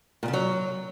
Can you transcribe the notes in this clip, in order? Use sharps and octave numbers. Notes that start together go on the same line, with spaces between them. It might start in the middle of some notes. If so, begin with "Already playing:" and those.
A#2
C#3
F#3